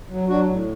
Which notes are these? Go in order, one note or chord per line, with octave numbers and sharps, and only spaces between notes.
F#3
F#3 D4 F#4
A2